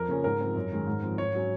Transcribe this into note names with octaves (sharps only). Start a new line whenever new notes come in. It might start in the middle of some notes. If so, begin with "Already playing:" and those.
Already playing: F2 A#4
C#3 F3 A#3 C#4
G#2 A#4
F3 C4
F#2
D#3 G#3 C#4
G#2
F3 C4
G#2 C#5
F#3 C#4